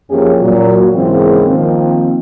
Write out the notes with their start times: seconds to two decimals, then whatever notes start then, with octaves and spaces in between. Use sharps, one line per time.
0.10 F#2 F3 A#3 C#4 G4 G#4
0.41 A#2 F#3
0.93 G#2 C#3 E3 A#3 C4
1.48 D#3 F3 A#3 C4